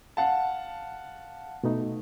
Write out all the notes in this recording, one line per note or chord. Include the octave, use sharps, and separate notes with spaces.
F5 F#5 A5
B2 A3 D#4